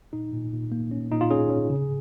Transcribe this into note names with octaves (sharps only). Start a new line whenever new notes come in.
A#2 D#4
A#2
A#2
A#3
C#4
A#2 D#4
F4
C#4 G#4
C#4
C#3